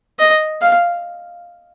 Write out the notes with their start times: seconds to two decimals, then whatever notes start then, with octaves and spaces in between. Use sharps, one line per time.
0.19 D#5
0.62 F5